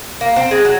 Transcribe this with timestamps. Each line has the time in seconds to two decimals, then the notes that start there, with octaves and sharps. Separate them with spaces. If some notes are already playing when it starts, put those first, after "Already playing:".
0.21 A#3
0.36 C4
0.51 G#3
0.65 F#3